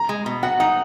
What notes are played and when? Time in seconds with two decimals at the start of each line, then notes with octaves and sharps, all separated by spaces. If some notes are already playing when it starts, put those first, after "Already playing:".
Already playing: A#5
0.09 G#3
0.26 B2
0.43 F#4 F#5
0.60 D#4 F#5